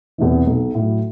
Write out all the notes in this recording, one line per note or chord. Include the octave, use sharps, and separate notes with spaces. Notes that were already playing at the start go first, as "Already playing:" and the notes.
E2 C3 E3
B1
A2 F#3